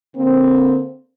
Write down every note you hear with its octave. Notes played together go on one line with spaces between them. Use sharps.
D3 A#3 C4